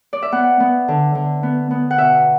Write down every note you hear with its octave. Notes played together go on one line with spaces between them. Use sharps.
D5
E5
B3 F#5
B3
D3
D3
B3
B3
F#5
B2 E5